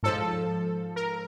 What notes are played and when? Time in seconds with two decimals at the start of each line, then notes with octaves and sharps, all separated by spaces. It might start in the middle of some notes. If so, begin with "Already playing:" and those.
0.03 G#2 F3 A4
0.96 A#4